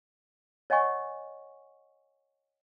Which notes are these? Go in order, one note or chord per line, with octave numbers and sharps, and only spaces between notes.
C#5 D#5 F#5 G#5 C#6